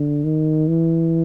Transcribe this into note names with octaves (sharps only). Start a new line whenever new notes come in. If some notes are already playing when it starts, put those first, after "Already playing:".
Already playing: D3
D#3
E3